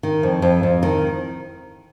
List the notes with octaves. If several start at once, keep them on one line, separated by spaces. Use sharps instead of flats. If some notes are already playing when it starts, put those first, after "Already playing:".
D#3
F2
F2
F2
D#3